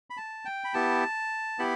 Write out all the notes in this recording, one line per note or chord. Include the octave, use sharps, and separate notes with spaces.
B5
A5
G5
B5
B3 E4 G4 A5
B3 E4 G4 B5